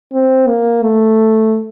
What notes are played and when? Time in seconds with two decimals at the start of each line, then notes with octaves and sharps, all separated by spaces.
0.13 C4
0.47 A#3
0.83 A3